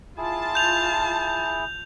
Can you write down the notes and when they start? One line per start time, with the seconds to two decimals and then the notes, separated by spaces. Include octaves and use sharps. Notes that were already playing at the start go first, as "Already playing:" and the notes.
0.18 E4 F4 G#4 A5
0.55 G6 F7